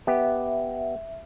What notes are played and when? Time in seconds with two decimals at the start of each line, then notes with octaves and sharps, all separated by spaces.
0.07 B3 G4 E5